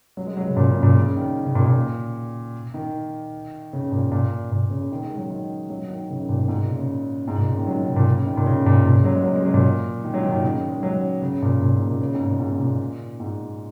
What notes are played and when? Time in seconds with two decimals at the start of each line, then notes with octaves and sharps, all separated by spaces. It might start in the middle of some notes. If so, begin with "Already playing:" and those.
0.17 F#3
0.27 G#3
0.37 F#3
0.47 C#3
0.57 A#2
0.70 C#3
0.83 A#2
0.97 C#3
1.16 D#3
1.46 C#3
1.55 A#2
1.66 A#2
2.74 D#3
3.73 C#3
3.92 A#2
4.12 A#2
4.52 A#2
4.70 C#3
4.91 D#3
5.04 G#3
5.17 F#3
5.30 D#3
5.70 F#3
5.90 D#3
6.10 C#3
6.20 D#3
6.29 A#2
6.39 A#2
6.48 G#2
6.59 A#2
6.68 C#3
6.79 C#3
7.28 G#2
7.38 A#2
7.47 C#3
7.58 D#3
7.67 F#3
7.77 D#3
7.86 C#3
7.96 A#2
8.06 C#3
8.27 D#3
8.37 A#2
8.46 C#3
8.66 A#2
8.86 A#2
8.95 C#3
9.04 F#3
9.15 G#3
9.24 F#3
9.35 G#3
9.45 F#3
9.54 A#2
10.04 D#3
10.14 F#3
10.23 D#3
10.33 A#2
10.43 C#3
10.57 D#3
10.69 G#3
10.83 F#3
11.22 C#3
11.42 A#2
11.62 A#2
11.74 G#2
11.87 A#2
12.01 C#3
12.15 G#2
12.27 A#2
12.40 G#2
12.52 G#2
12.60 A#2
13.20 G#2